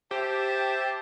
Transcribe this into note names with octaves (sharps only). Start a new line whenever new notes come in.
G4 C5 E5 A5